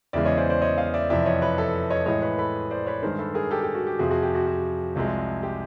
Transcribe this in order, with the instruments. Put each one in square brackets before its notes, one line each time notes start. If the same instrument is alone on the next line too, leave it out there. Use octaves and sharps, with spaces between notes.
[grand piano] E2 C#3 E3 G#3 D5 E5
C#5 D#5
C5 D5
C5 D5
C#5 D#5
D#5 F5
D5 E5
F2 C3 E3 D5 E5
C#5 D#5
B4 C#5
A4 B4
C#5 D#5
A2 E3 G#3 C#5 D#5
B4 C#5
A4 B4
C5 D5
B4 C#5
G2 D#3 G#3 A#4 C5
A4 B4
G#4 A#4
G4 A4
G4
F#4
G4
F2 C3 F3 F#4 G#4
F#4 G#4
G4
F#4
F#4
C2 C3 F3 G#3
G4